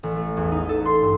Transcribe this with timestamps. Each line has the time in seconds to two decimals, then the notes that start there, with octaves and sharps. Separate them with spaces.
0.03 A1
0.16 A3
0.37 E2
0.52 D#4
0.69 A4
0.85 C6
1.01 G2